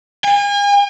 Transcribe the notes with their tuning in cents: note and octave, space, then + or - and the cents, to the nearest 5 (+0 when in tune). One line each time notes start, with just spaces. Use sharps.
G#5 -40